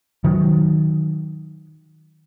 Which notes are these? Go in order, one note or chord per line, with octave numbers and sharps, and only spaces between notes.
D#3 F#3